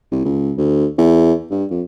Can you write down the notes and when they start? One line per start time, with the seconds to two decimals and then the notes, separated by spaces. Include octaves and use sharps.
0.12 C2
0.25 C#2
0.57 D2
0.98 E2
1.51 G2
1.70 F2